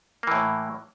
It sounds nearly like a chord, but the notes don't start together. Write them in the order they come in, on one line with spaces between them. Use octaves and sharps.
A#3 E3 A2